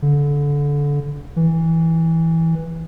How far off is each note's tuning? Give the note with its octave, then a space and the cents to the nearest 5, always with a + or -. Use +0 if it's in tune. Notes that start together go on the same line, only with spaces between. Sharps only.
D3 -25
E3 -10